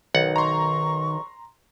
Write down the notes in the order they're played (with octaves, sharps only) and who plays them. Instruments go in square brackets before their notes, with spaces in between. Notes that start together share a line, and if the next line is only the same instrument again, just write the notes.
[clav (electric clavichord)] B1 F#5 [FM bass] D#3
[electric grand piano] A#5 C6 [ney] C#6